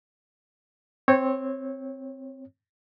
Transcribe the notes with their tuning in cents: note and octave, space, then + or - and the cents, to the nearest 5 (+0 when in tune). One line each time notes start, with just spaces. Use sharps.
C4 +0 C#5 -20